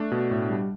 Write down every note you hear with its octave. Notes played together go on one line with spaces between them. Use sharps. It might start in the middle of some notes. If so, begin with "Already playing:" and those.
Already playing: A3 D4
B2
A2
G3